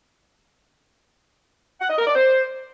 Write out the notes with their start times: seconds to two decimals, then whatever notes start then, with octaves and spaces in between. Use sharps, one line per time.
1.81 F#5
1.90 D#5
1.98 A#4
2.07 D5
2.16 C5